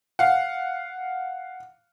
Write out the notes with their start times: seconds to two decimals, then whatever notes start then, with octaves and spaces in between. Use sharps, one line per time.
0.19 F5 F#5